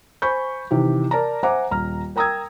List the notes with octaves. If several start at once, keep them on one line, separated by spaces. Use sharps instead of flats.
C5 G#5 B5 C#6 G6
C3 D#3 E3 G4
A#4 D5 A5 A#5
C5 E5 F#5 G#5 A#5 D6
D#1 A#5 F6
A#4 G5 A#5 D#6 E6 G#6